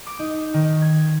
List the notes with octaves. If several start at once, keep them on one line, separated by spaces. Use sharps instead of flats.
D6
D#4
D#3
G#6